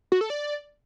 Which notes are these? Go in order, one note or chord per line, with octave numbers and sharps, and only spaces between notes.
F#4
A4
D5